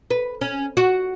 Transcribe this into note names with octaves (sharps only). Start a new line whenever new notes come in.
B4
C#4
F#4